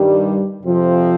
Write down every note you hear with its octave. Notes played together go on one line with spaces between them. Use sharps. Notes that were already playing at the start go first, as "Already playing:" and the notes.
Already playing: G2 D#3 G3
F2 C3 F3 C4